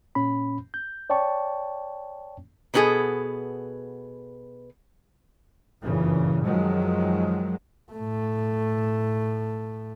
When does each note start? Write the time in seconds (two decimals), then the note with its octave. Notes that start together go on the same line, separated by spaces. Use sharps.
0.15 A#2 C#4 B5
0.74 G6
1.10 C#5 D5 G5 A5 C#6
2.74 B2 B3 C#4 F#4 G#4 A4
5.83 F#1 G2 A#2 C#3 E3
6.45 F#2 D#3 F3 F#3 G#3
7.92 A2 A3